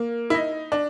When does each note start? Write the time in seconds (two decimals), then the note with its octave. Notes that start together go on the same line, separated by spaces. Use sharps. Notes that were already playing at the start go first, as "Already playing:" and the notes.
Already playing: A#3
0.30 E4
0.34 D#4
0.72 D4